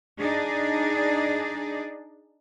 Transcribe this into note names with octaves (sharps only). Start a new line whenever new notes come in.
D4 D#4 G#4 D5